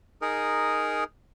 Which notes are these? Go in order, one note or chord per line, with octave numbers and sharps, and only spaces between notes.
D#4 G#4 A#4